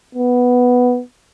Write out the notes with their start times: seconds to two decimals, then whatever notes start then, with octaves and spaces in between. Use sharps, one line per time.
0.15 B3